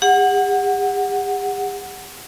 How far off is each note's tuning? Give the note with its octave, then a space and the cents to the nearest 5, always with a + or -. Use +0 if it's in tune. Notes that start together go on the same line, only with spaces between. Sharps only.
G4 +45 F#5 +0